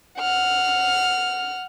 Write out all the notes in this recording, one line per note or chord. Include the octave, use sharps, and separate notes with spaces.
F#5 F6